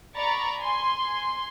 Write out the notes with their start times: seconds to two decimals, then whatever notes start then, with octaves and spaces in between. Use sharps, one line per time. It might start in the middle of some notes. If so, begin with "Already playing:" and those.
0.15 D5 A#5 B5 C#6 A6
0.61 G#5 C6